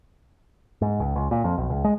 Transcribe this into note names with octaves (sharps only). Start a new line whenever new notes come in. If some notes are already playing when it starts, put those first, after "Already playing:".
G#2
C#2
C#2
A#2
F2
B1
C#2
G#3